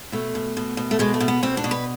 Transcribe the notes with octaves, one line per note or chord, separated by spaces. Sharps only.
B2 A3
B2
B2
B2
A3
B2 G#3
A3
B2
B3
B2 C4
D4
B2
B4